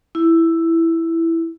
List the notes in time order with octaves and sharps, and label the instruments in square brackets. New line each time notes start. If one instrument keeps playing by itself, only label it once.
[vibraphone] E4